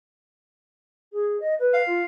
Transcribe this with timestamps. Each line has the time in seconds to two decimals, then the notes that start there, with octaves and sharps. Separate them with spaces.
1.13 G#4
1.40 D#5
1.59 B4
1.74 F5
1.87 F4